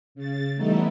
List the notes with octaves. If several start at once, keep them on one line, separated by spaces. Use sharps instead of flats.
C#3 A6
E3 G3 A3 B3 D#4 E4